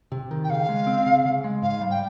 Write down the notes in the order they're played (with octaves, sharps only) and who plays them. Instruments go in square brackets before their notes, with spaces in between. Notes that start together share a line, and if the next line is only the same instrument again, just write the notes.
[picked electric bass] C3
D#3
[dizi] G5
[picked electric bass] C#3 [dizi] F5
[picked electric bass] G#3
C4
C#3
C#3
G#3
[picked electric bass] G#2 [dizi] F5
[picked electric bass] G3
[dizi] G5